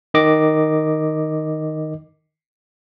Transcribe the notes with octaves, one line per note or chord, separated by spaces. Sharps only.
D#3 D#5 D6